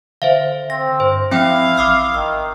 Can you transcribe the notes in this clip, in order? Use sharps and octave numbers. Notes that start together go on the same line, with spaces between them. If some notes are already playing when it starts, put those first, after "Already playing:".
D3 C5 E5 F5
C4 A#6
G2 C5
F3 C4 E4 F5 G5
A1 D6 D#6 F6
G#1 D#3 E6